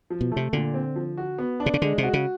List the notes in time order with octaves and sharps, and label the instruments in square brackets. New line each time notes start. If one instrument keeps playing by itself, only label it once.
[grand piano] F3
[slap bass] B2
[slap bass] C3 [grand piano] A3
[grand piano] A#2 [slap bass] D3
[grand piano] C4
F3
F#4
B3
D4
[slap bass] C3
C#3
[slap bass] D3 [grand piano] G#3
[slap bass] C3
[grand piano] F#4
[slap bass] C#3